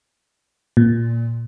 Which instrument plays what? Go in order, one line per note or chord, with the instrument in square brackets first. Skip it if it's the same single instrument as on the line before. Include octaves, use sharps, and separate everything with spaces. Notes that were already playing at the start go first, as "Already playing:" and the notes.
[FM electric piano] A#2